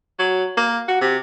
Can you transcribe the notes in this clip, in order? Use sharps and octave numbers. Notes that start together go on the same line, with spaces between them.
F#3
A#3
F#4
C3